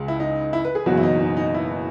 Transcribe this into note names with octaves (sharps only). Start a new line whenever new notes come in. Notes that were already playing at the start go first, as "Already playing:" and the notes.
Already playing: C#2 C#3 G#3
E4
D#4
E4
B4
G#4
F#1 E2 B2 F#3 F#4
E4
D#4
D#4
D#4
E4